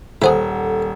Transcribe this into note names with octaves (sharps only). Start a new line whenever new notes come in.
D#1 G#4 A4 C5 E5 F#5